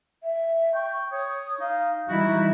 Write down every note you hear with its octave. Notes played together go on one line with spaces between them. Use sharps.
E5
G5 C#6
C#5 D#6
D#4 F5
E3 G3 D#4 E4 F#4